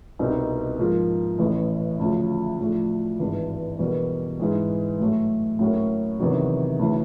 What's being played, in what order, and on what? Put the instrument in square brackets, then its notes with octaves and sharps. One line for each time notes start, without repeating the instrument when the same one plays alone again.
[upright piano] C2 B2 G3 C4 D#4
G#2 F3 A#3
A1 A2 E3 A3 C#4
D2 C#3 F3
A2 F3 A3 D4
G#1 G2 E3 G#3
E2 B2 G3 A#3
G#2 E3 G#3
A2 F#3 A3
A2 F#3 A#3 C#4
E2 C3 D#3 F#3
D2 C#3 E3